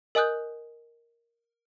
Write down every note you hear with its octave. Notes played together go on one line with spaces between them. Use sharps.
A#4 D#5 G#5 D#6 F#6 G6